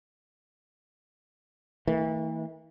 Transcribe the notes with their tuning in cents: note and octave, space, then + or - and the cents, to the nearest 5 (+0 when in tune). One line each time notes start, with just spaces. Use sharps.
E3 -35 A3 +45